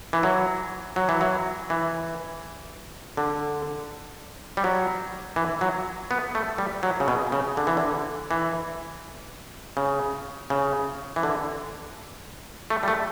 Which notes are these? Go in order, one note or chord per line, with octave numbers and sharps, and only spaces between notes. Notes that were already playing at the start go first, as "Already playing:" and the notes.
E3
F#3
F#3
E3
F#3
E3
D3
G3
F#3
E3
F#3
B3
A3
G3
F#3
C#3
B2
C#3
D3
E3
D3
E3
C#3
C#3
E3
D3
A3
G3
A3